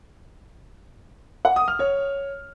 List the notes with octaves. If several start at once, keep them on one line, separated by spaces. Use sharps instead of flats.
F#5
D#6
F6
C#5